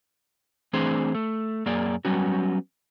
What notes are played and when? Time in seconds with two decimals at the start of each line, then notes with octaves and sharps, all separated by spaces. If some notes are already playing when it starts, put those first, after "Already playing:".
0.73 E3 A3 C4 D4 G#4 C5
1.15 A3
1.66 F#2 A#3 G#4 D5
2.05 F#3 G3 B3 C#4 F#4